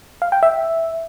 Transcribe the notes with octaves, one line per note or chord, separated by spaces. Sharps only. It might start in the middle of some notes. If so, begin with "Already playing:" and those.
F5
G5
E5